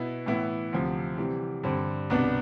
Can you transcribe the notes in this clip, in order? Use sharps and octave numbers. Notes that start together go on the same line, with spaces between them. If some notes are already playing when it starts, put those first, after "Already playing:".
Already playing: B2 B3 E4
A2 E3 B3 E4
D2 C3 F3
C3 E3 G3
G2 D3 G3 C4
C2 B2 B3 D4